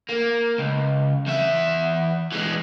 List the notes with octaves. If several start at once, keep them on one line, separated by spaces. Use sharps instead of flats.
A#3
C#2
E2 E5
E3 G#3